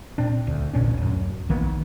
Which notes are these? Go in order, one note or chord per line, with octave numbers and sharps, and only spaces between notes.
A#2 C4 D4
D2
A1 A#2 C#4 D4
D1 F#2
A#1 D#3 A#3 B3